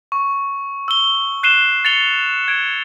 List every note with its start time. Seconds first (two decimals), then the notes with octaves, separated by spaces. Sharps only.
0.12 C#6
0.88 E6 G7
1.43 F#6 C7 D#7 E7 G7
1.85 A6 C#7 F7 G7
2.48 G#6 D7